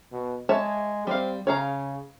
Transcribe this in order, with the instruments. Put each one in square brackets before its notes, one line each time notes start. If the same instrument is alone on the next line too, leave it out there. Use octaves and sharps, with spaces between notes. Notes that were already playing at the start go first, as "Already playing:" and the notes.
[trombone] B2
[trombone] G#3 [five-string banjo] C#5 E5 A5
[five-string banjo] G3 F5 [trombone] C4
[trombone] C#3 [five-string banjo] C#5 F5 A#5